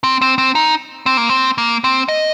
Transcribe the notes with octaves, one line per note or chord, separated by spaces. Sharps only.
C4
C4
C4
D#4
C4
A#3
C4
A#3
C4
D#5